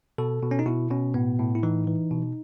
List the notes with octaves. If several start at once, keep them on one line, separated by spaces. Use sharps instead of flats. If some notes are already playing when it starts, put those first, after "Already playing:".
B2 A4
B2
C#4
D#4
B2 E4
B2 C#4
A2 B3
A2
E4
E3 D#4
E3
B2